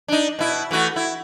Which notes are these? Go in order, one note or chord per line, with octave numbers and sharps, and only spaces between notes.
D4 D#4
B2 E4
E3 A3 F#4
E4